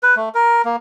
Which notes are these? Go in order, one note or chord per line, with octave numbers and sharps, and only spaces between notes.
B4
A3
A#4
A#3